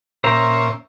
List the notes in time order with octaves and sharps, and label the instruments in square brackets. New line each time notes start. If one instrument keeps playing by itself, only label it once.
[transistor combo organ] A#2 C#4 [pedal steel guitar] C5 E5 A#5